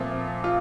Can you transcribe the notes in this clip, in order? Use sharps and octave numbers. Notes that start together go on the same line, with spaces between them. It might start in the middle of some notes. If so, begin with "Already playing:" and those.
Already playing: A#2 F3 A3 C4
F4